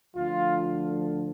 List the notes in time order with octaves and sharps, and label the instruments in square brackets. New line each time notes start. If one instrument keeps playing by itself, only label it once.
[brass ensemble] D2 D3 F3 F4